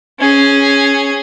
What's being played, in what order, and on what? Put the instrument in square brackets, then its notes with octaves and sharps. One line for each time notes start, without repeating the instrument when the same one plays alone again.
[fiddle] C#4 G#4